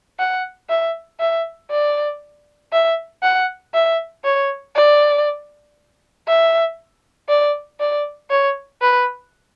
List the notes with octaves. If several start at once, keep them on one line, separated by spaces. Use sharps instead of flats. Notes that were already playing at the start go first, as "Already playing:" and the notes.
F#5
E5
E5
D5
E5
F#5
E5
C#5
D5
E5
D5
D5
C#5
B4